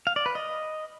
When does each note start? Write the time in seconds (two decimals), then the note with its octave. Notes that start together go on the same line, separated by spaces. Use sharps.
0.07 F5
0.16 D5
0.26 B4
0.35 D#5